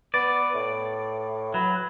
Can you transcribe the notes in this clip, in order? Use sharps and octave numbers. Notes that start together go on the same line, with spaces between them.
B3 D5
A2
F#3 B4